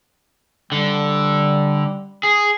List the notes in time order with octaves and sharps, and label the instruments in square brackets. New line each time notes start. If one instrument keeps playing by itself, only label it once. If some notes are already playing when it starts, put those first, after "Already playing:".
[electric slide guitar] D3 [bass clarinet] G3
[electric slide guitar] G#4